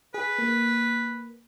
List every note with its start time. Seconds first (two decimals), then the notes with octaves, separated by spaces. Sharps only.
0.14 G#4 B4
0.38 A#3